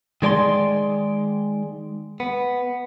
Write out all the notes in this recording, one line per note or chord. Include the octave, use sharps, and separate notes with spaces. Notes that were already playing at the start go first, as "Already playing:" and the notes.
D#3 G#3 D5 G#5 C6
B3